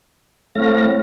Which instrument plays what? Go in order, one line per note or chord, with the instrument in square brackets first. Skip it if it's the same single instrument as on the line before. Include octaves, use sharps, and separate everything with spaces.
[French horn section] A2 C4 C#5 [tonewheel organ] A3 F5 A#6